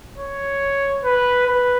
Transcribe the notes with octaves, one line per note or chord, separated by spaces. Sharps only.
C#5
B4
B4